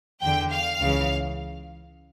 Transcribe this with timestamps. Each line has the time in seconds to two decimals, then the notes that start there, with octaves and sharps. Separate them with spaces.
0.21 E2 D3 G5
0.51 F5
0.81 C#2 C#3 E3